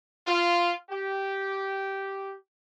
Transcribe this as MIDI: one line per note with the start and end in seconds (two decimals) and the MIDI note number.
0.27 0.73 65
0.90 2.34 67